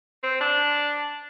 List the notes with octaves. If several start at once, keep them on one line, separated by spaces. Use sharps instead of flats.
C4
D4